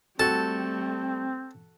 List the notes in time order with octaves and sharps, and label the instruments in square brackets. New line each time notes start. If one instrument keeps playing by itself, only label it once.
[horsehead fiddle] G3 A3 [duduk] C4 [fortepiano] F#4 A4 [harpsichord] A5